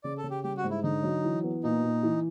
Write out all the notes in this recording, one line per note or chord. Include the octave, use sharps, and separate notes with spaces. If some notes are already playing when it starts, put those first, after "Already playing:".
C#3 D5
A4
C#3
G4
G3 G4
F#4
G#2
E4
D3 D#4
F#3
E3
B3
A#2 D#4
A#2
E3